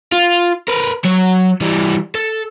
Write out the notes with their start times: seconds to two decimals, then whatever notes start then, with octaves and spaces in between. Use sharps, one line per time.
0.12 F4
0.68 A#4 B4
1.04 F#3 C#5
1.61 E3 G3
2.15 A4